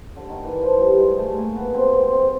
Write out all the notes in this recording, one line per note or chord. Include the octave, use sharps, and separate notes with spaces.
D3
D#3
E3
F3
G3
G#3
A3
A#3
B3
C4
C4
C4